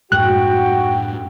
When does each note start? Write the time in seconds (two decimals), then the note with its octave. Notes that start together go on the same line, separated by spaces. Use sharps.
0.12 F#2 A2 G#3 F#4 G5 F#6